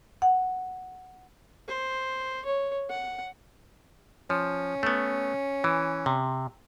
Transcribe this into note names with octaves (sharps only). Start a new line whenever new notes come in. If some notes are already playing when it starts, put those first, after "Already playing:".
F#5
C5
C#5
F#5
F3 C#4
A3 B3
E3
C3